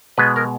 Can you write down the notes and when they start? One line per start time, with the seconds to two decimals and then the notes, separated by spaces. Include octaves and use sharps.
0.18 B2 G#3 B3 B4
0.36 A#4